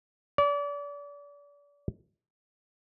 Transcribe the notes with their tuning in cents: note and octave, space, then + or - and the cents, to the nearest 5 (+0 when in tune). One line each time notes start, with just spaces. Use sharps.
D5 -35